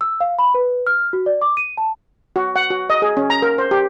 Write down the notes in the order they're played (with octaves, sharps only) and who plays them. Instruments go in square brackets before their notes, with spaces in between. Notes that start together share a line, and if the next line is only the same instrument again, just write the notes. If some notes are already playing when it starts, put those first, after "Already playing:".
[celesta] E6
F5
B5
B4
F6
F#4
D5
D6
D#7
A5
[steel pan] F#4
F#5
F#4
D#5
G#4
C#4
A#5
A#4
C5
G4